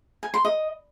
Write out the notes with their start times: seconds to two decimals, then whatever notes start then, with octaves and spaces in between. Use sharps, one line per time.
0.23 G#5
0.34 C6
0.45 D#5